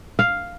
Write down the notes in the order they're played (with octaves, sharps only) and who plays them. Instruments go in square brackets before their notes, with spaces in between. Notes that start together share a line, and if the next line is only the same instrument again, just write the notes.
[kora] F5